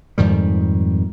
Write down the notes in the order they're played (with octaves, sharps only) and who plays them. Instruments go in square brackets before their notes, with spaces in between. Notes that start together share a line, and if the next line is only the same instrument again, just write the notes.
[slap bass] F2 G#2 D#3 G3